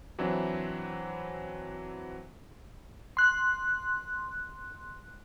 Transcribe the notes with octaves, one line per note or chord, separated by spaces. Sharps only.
E3 F#3 C4 D4 E4
C6 F#6